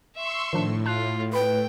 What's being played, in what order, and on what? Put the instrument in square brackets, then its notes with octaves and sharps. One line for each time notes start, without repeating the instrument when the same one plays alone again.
[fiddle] E5 [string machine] C6 C#6 E6
[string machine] A2 [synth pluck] D#3 F3 D4
[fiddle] F4 [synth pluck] A5 F#6
[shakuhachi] B4 [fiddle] G5 [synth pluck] B5